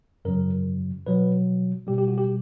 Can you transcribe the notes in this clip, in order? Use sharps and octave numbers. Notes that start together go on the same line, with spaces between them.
F#2 C#3 F#3 A#4
B2 F#3 B4
B2 G3 G4
G4
F#4
G4